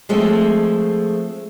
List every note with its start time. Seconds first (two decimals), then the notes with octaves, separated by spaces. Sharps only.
0.09 F3 G#3 A3 C4